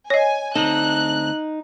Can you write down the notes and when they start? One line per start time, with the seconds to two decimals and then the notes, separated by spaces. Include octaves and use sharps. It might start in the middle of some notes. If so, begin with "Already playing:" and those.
0.10 C#5 D#5 G#5
0.55 D2 C4 D#4 A4 F#6